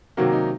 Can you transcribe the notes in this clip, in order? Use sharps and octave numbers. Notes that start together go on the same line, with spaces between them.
C3 D#3 F#3 A#3 F#4
D#4